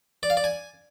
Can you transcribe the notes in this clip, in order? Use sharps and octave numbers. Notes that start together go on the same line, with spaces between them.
D5
F5
D5
G#5